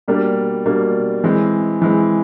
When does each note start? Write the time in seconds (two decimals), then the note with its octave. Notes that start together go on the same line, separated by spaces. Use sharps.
0.08 B2 G3 A#3 D4
0.66 B2 G3 A#3 D4
1.24 E3 G#3 C4
1.82 E3 G#3 C4